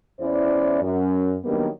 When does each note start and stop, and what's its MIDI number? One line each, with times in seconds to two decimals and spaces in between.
0.20 0.80 40
0.20 0.80 61
0.20 0.80 64
0.20 0.80 72
0.20 0.80 74
0.82 1.36 42
1.44 1.67 51
1.44 1.67 54
1.44 1.67 55
1.44 1.67 58
1.44 1.67 59
1.44 1.67 62